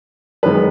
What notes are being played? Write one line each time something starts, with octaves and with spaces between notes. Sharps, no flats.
F#2 D#3 G#3 B4